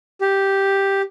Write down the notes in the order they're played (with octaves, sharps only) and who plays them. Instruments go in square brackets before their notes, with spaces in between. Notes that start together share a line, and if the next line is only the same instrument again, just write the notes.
[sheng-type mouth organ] G4